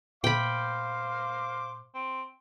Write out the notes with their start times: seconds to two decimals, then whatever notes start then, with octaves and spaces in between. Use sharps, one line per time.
0.24 A#2 C5 F5 G5 B5 D6
1.94 C4